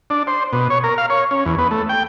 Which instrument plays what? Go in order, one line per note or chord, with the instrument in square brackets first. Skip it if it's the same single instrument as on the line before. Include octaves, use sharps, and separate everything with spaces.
[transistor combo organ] D4
C5
B2
C#5
A#4
F5
C#5
C#4
E2
B3
A3
G5